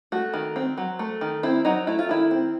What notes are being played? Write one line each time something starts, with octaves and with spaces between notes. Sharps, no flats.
A3 F#4
D#3
C4
F#3
A3
D#3
C4 E4
F#3 D#4
A3 E4
F4
D#3 E4
C4